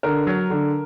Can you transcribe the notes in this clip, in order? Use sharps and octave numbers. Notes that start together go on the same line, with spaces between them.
D3 A#4
F#3
D3